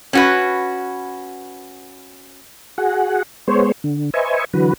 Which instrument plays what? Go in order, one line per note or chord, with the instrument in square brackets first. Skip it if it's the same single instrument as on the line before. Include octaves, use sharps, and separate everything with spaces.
[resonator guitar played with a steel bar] C#4 F#4 B4
[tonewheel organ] F#4 G#4 F#5
G#3 B3 C5 C#5
D3
B4 C5 D#5 E5 G#5 C#6
D3 E3 F#3 F#4 B4